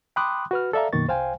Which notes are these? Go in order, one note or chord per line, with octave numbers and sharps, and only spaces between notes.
G5 B5 C6 D6 D#6 F#6
F#4 B4 F6
A4 D5 E5 F5 A#5
F#2 B2 D#3 A#3 C#6 A6
C2 C5 F5 G5 G#5